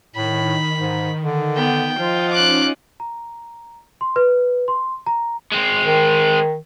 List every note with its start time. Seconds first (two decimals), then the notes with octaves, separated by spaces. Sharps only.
0.16 A2 D#3 B5
0.80 G#2
1.22 D3
1.56 B3 G5
1.99 F3 F4 D#5 F#5
2.31 C#4 D#4 D6 F#6
3.00 A#5
4.01 C6
4.16 B4
4.68 C6
5.07 A#5
5.52 G#3 C4
5.86 D#3